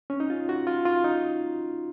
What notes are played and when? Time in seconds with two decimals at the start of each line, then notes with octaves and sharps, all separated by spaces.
0.10 C#4
0.20 D#4
0.30 F4
0.49 F#4
0.67 F4
0.85 F4
1.04 D#4